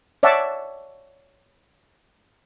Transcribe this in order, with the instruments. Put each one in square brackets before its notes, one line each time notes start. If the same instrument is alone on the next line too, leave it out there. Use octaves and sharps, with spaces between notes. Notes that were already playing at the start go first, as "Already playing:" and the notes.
[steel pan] C#5 D5 E5 F#5 A5